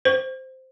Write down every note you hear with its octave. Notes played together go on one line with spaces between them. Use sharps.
C5